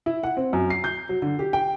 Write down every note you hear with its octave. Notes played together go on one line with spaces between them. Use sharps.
E4
F#5
C4
F#2
C7
G6
F#3
D3
G4
G5